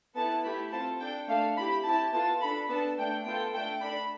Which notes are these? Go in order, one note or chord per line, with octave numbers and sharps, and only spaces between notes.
B3 E4 A4 A5
A3 E4 G4 B5
C4 F4 A4 A5
D4 A4 G5
A3 D4 A4 F5
C4 E4 G4 B5
C4 E4 G4 A5
B3 F4 A4 A5
D4 A4 B5
B3 D4 A4 A5
A3 D4 A4 G5
B3 F4 A4 G5
A3 D4 A4 G5
D4 A4 B5